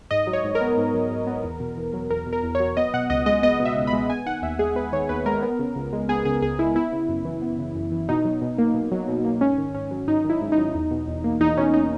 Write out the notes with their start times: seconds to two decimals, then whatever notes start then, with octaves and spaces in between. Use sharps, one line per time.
0.11 G#2 D#5
0.27 F#3
0.33 C#5
0.44 G#2
0.55 A#4
0.61 B3
0.77 G#2
0.94 F#3
1.11 G#2
1.27 B3
1.44 E2
1.60 B2
1.77 E2
1.94 F#3
2.10 E2 A#4
2.27 B2
2.33 A#4
2.43 E2
2.55 C#5
2.60 F#3
2.77 B3 D#5
2.94 B2 F#5
3.10 C#2 D#5
3.26 G#3 D#5
3.43 B3 D#5
3.60 B2
3.65 E5
3.76 C#2
3.87 B5
3.93 G#3
4.10 B3 G#5
4.26 D#3 F#5
4.42 D#2 E5
4.59 G#3 G#4
4.76 B3 B4
4.92 D#3 C#5
5.09 D#2 B4
5.26 G#3 A#4
5.43 B3
5.59 C#3
5.76 C#2
5.93 G#3
6.09 B3 G#4
6.25 C#3 G#4
6.42 C#2 G#4
6.59 G#3 E4
6.75 B3 E4
6.92 C#3
7.09 F#2
7.25 E3
7.42 B3
7.58 C#3
7.75 F#2
7.92 E3
8.09 B2 D#4
8.25 F#3
8.42 B2
8.58 A#3
8.74 B2
8.92 F#3
9.08 B2
9.24 A#3
9.41 G#2 C#4
9.58 D#3
9.75 G#2 C#4
9.91 F#3
10.07 G#2 D#4
10.25 D#3
10.30 E4
10.41 G#2
10.52 D#4
10.58 F#3
10.74 E2
10.91 B2
11.07 E2
11.24 A#3
11.40 E2 D#4
11.57 B2 C#4
11.74 D#4